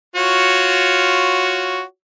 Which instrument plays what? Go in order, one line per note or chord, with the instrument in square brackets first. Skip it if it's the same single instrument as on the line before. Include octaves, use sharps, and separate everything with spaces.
[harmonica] F4 F#4 C#5